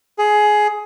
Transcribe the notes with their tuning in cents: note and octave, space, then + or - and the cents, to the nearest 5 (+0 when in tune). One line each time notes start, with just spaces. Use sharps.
G#4 +15